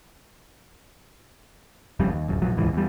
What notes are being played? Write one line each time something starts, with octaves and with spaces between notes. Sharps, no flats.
F#1 F2 C#3 G3
D#2
D1 F#2
F1 A#1 F#3
D#1 C#2 G#2 E3
E2 G3